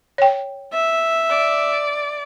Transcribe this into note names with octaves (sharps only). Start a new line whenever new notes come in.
C#5 G5
E5
D5